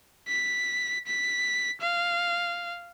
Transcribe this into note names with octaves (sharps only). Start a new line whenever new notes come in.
B6
B6
F5